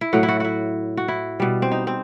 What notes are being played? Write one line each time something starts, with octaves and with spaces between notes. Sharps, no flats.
E4
A2 F#3 F#4
E4
F#4
E4 F#4
F#4
E4
B2 G3
C4
D#4
C4